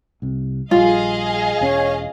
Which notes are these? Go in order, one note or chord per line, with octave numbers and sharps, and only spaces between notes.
C2 C3
A#1 G3 F4 G#4 D#5 F5
E1 C#4 C#5